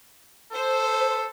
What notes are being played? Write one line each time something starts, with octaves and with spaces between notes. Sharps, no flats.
A4 C5